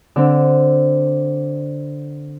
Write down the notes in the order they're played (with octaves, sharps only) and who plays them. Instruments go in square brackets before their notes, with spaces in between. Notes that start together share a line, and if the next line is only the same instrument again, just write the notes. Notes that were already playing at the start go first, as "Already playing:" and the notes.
[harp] D3 C4